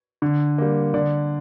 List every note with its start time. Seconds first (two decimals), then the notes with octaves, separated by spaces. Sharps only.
0.22 D3
0.58 G3 A#3
0.94 D3 D5